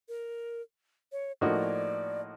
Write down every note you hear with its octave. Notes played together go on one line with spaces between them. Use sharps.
A#4
C#5
A2 F3 A#3 D#4 F#4 D5